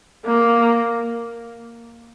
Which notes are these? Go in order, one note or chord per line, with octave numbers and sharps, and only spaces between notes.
A#3